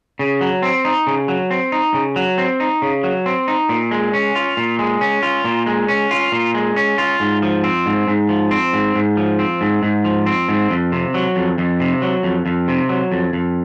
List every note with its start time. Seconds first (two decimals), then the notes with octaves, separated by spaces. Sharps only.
0.19 C#3
0.41 F#3
0.62 C4
0.85 D#4
1.07 C#3
1.28 F#3
1.51 C4
1.72 D#4
1.94 C#3
2.16 F#3
2.38 C4
2.60 D#4
2.82 C#3
3.03 F#3
3.26 C4
3.48 D#4
3.69 A#2
3.91 G#3
4.13 C#4
4.35 F4
4.57 A#2
4.79 G#3
5.01 C#4
5.23 F4
5.44 A#2
5.66 G#3
5.88 C#4
6.11 F4
6.32 A#2
6.54 G#3
6.76 C#4
6.98 F4
7.20 G#2
7.42 F3
7.64 C4
7.86 G#2
8.08 G#2
8.29 F3
8.51 C4
8.73 G#2
8.95 G#2
9.17 F3
9.39 C4
9.61 G#2
9.83 G#2
10.04 F3
10.26 C4
10.48 G#2
10.70 F2
10.92 C3
11.14 F#3
11.36 F2
11.58 F2
11.80 C3
12.02 F#3
12.23 F2
12.46 F2
12.68 C3
12.89 F#3
13.12 F2
13.33 F2